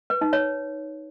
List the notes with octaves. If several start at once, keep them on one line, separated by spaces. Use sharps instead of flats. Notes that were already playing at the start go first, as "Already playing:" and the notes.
B4
D#4
C#5